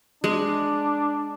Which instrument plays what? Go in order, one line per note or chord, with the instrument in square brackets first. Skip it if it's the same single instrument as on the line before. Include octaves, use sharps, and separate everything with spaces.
[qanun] G#3 [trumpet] D4